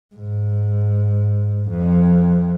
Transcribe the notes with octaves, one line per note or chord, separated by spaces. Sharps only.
G#2
F2